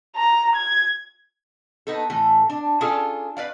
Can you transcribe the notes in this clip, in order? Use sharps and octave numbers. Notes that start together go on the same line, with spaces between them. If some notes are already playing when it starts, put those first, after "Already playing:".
A#5
G#6
B3 D#4 A4
A2 E3 A4
D4
C#4 D4 F4 G#4 A4
B4 D5 F5